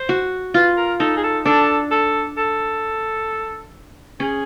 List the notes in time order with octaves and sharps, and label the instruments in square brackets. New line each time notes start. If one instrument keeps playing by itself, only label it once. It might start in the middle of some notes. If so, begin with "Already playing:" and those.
Already playing: [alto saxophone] C5
[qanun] F#4
[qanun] F4 [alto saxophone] B4
[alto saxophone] A#4
[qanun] D#4 [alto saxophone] A4
[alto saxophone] G#4
A4
[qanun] D4 [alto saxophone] A4
[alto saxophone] A4
A4
[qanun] C#4 [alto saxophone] G#4